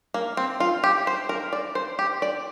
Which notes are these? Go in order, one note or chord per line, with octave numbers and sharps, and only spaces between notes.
A#3
C4
F4
G4
C5
A#4
D5
C5
G4
D5